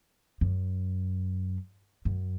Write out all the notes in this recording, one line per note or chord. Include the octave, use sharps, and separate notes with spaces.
F#2
F#2